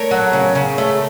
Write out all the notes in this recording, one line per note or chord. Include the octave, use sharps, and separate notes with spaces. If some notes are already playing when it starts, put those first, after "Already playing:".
Already playing: A3 A#4 C#5
F#3
C#3
C#3
A3